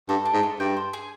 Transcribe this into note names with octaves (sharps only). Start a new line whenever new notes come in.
G2 A4
D4
G#2
A3
G2 G5
C5
G#4